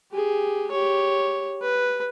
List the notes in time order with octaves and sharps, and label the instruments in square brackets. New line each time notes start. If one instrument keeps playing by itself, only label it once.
[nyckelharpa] G4 G#4
G4 C#5
B4